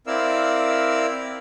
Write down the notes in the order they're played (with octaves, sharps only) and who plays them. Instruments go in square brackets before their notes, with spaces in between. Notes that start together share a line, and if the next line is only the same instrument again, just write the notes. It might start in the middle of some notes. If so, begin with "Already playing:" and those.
[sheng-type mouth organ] C4 E4 A#4 D5 F5 E6